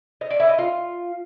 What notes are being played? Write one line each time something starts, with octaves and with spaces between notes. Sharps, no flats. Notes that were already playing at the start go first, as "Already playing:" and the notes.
D#5
D5
E4
D#5
F4